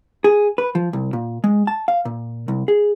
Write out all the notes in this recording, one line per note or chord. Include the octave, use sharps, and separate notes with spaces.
G#4
B4
F3
C2
A#2
G#3
A5
F5
A#2
C2
G#4